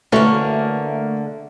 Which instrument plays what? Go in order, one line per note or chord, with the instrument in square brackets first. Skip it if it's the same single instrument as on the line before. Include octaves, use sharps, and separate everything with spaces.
[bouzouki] D3 A#3 [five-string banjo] E3 C#4 F#4 [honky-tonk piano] A3